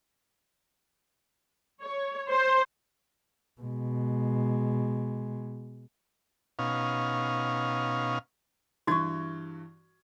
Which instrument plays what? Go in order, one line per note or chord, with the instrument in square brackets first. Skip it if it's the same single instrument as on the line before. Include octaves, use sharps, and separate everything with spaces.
[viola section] C#5
C5
[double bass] B2 G#3
[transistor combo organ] B2 C#4 D#4 F5
[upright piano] G2 E3 G#6 [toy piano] F#4 C#6